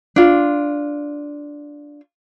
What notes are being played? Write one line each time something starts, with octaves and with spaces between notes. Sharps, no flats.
D4 F4